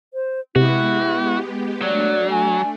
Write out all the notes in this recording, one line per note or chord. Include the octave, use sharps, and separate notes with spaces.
C5
C3 G#3 B3 E4 F#4 G4
F#3 A3 D4 D5
G#5